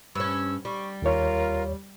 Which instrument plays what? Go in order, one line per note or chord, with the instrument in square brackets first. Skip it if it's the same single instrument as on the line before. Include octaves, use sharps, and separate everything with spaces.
[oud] G2 C#4 [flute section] E6
[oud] G3 [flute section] C#6
[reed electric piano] D#2 C#5 [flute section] F4 A#4